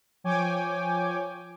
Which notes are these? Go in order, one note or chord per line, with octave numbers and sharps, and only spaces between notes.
F3 C#5 G5 G#5 D6